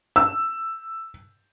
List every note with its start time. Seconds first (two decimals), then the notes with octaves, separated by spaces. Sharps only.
0.16 E6